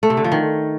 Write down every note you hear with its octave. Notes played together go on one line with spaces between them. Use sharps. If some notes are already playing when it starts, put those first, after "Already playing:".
A3
C3
D3
F3
D#3